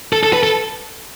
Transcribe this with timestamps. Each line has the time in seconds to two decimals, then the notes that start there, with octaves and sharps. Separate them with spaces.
0.13 A4
0.23 A4
0.33 B4
0.43 A4